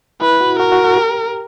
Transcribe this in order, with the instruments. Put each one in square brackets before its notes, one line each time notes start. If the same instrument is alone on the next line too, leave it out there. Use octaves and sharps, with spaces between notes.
[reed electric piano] E4 [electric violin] B4
[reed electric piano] F#4
[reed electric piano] F#4 [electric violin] A#4
[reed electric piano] F#4
F#4
G4